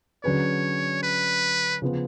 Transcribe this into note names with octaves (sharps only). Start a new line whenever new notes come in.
D3 F#3 C#4 G#4 B4 C#5
B4
C#3 F3 B3 F4